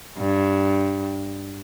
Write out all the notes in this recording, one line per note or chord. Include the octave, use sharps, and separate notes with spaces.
G2